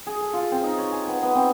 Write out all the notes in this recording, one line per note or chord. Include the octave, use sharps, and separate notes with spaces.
G#4
A4
F4
C4
D#4
C#5
G#5
B3
B3
C4